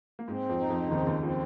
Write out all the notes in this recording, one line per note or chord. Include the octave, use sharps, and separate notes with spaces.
A#3
G#2 G#3 C4
F2 F3
D#4
F2 F3
C#3
D#2 D#3 C4
C#3
D#2 D#3
F3 C4